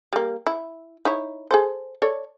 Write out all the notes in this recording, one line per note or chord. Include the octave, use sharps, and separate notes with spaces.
G3 A#3
E4
D#4 E4 C#5
G#4 A4 C5
A4 C#5 D5